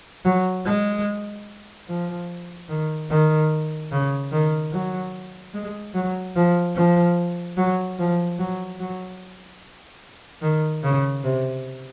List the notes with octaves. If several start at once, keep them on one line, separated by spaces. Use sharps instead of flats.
F#3
G#3
F3
D#3
D#3
C#3
D#3
F#3
G#3
F#3
F3
F3
F#3
F3
F#3
F#3
D#3
C#3
C3